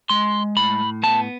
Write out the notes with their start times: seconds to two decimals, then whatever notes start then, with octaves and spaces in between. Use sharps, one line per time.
0.10 G#3 C6
0.57 A2 B5
1.03 B3 A5